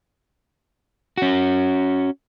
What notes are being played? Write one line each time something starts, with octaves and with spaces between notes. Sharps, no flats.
C#4 F#4